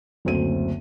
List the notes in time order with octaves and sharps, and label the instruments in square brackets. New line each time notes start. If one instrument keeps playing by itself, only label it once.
[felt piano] F#1 D2 C4 D#7